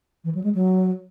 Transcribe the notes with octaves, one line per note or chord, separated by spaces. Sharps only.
E3
F#3
G#3
F#3